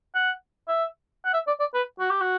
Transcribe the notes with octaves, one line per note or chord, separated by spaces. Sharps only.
F#5
E5
F#5
E5
D5
D5
B4
F#4
G4
F#4